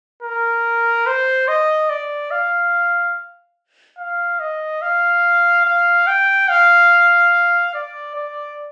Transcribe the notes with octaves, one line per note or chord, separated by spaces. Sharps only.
A#4
C5
D#5
D5
F5
F5
D#5
F5
F5
G5
F5
D5
D5